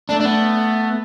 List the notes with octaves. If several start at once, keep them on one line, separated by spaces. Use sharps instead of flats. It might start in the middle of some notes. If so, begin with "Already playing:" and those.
A3 D4
D4
B3